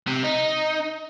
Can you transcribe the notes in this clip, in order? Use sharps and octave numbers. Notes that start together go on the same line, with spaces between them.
C3
D#4